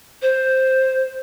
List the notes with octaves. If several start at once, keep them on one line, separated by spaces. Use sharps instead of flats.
C5